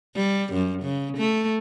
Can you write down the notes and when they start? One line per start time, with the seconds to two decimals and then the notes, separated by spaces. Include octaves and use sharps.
0.15 G3
0.53 F#2
0.83 C#3
1.18 A3